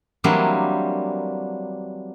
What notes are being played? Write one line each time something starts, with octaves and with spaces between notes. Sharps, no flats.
E3 F#3 G3 A#3 C4 D4